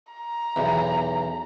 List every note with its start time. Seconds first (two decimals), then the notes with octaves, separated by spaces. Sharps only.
0.13 A#5
0.56 B1 E2